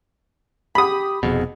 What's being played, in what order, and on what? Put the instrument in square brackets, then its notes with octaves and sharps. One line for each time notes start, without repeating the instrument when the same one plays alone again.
[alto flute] G4 [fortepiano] B5 D#6
[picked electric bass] F1 F2 B2 [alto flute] G#4